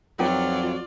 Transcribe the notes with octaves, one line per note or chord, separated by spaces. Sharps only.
F2 F#3 D#4 F4 B4 D5 G5